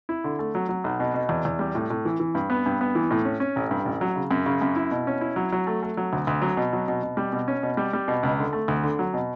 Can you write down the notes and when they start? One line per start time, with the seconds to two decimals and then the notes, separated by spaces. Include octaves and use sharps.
0.09 E4
0.24 D3
0.39 A3
0.55 F#3
0.69 F#3
0.84 B1
1.00 B2
1.14 B2
1.29 E2
1.45 E2
1.59 G3
1.75 A2
1.90 A2
2.05 E3
2.20 E3
2.35 G2
2.50 B3
2.66 G2
2.81 B3
2.95 E3
3.11 A2
3.25 C#4
3.40 C#4
3.56 A1
3.71 G2
3.85 A1
4.01 F#3
4.16 C#3
4.31 F#2
4.46 C#3
4.62 F#2
4.76 E4
4.91 B2
5.07 C#4
5.21 E4
5.36 F#3
5.52 F#3
5.67 A3
5.83 A3
5.97 F#3
6.13 D2
6.27 D2
6.42 F#3
6.57 B2
6.73 F#3
6.88 B2
7.03 B2
7.17 G3
7.33 B2
7.48 C#4
7.63 B2
7.77 G3
7.93 G3
8.08 B2
8.23 C#2
8.39 D3
8.53 A3
8.68 D2
8.83 D3
8.99 F#3
9.14 B2